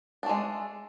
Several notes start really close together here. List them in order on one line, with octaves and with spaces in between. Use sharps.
D4 A3 G#3